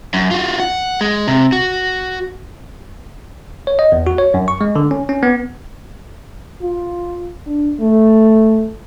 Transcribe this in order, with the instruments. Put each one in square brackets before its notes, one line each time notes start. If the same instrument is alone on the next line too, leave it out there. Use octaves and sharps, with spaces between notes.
[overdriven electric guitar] F#2
F4 F#4
F#5
G#3
C3
F#4
[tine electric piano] C#5
D#5
E2
F#4
C#5
F#2
C#6
G#3
D3
C#4
C#4
B3
[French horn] F4
D4
A3